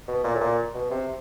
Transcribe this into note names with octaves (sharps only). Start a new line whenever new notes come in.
B2
A#2
A2
A#2
B2
C3